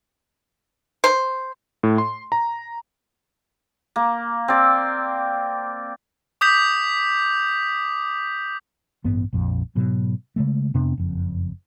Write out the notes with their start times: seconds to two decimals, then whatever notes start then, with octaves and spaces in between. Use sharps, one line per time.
1.04 C5
1.83 A2
1.98 C6
2.32 A#5
3.96 A#3
4.48 C4 D5
6.41 D6 D#6 G6 B6 F7
9.04 A1 G2 B3
9.33 A#1 F2
9.75 G#2 B2 F#3
10.36 C#3 G#3 A3
10.74 F2 C3 B3 D4
10.98 F#1 F2